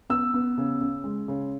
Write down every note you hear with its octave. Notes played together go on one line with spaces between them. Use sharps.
B3 E6
B3
C#3
C#3
G#3
C#3